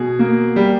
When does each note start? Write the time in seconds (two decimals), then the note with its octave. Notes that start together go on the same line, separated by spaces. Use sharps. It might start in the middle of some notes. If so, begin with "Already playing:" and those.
Already playing: B2 G#4
0.19 A#3
0.56 G3